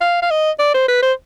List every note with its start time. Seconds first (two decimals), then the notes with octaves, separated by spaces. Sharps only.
0.01 F5
0.22 F5
0.30 D#5
0.59 D5
0.74 C5
0.88 B4
1.02 C5